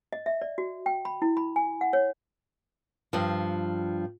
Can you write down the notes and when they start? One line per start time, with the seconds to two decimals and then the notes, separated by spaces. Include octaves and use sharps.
0.13 D#5
0.26 E5
0.42 D5
0.58 F#4
0.86 G5
1.05 B5
1.22 E4
1.37 B5
1.56 G#5
1.81 F#5
1.93 C#5
3.13 G2 F3